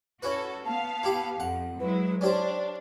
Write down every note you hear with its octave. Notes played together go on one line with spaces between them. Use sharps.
C#4 E4 F#4 A4 B4
B3 F5 A5
E4 G4 B5
F2 F#5
F#3 G#3 E4 B4
C#4 D4 G4 C5 D5